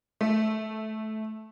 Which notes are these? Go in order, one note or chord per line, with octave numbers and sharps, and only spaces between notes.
A3